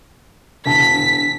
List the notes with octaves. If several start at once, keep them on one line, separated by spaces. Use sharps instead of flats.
E1 D3 A5 B6